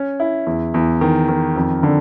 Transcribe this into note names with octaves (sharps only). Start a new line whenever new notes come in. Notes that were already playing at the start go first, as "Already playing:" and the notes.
Already playing: C#4
E4
E2
E2
D#3
D#3
F2
D3